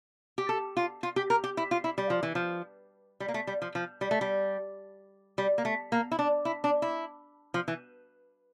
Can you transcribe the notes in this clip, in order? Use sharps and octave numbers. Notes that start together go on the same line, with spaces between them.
G4
A4
F4
F4
G4
A#4
G4
E4
F4
E4
G3
F3
E3
F3
G3
A#3
A3
G3
F3
F3
G3
A3
G3
G3
A#3
A3
A#3
E4
D4
E4
D4
E4
F3
E3